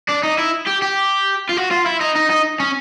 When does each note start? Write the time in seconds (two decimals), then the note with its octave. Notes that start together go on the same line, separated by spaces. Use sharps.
0.09 D4
0.23 D#4
0.39 E4
0.67 G4
0.83 G4
1.49 F4
1.57 F#4
1.71 F4
1.86 E4
2.01 D#4
2.15 D#4
2.30 D#4
2.60 C#4